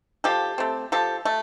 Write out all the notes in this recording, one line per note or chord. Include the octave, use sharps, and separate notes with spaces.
F3 G4 A4
A3 C4
F3 G4 A4
A3